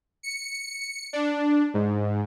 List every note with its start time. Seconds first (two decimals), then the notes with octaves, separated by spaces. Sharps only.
0.23 C#7
1.13 D4
1.74 G#2